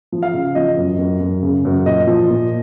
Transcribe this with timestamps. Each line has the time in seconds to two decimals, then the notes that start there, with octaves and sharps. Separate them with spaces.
0.12 F3
0.23 F5
0.33 C#3
0.55 F3 D#5
0.77 F#2
0.99 F#2
1.20 F#2
1.43 C#3
1.65 F#2
1.86 A#2 D#5
2.07 F3
2.30 A#2